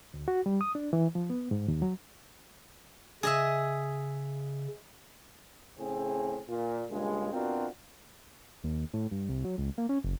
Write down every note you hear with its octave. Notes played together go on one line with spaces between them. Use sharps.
D2
F#4
G3
D#6
D4
E3
F3
B3
G#2
D#2
F#3
C#3 G#4 D#5 E5
A2 C#3 C4 G#4
A#2
G2 A#2 C#3 G#3
B2 C4 D4 F4 F#4 A#4
D#2
A2
G2
C2
F#3
C#2
A#3
C#4
F#1